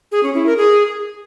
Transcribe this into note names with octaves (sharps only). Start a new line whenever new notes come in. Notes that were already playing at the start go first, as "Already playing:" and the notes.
G#4
C#4
E4
A#4
G#4